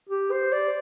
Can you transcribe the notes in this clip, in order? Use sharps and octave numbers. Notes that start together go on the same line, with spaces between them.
G4
C5
D5